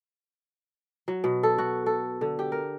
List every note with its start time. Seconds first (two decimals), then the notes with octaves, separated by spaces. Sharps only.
1.08 F#3
1.24 B2
1.43 A4
1.58 F#4
1.86 A4
2.21 D3
2.39 G4
2.52 A#4